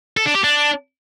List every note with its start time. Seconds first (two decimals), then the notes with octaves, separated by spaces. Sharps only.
0.17 A4
0.26 D4
0.35 G4
0.44 D4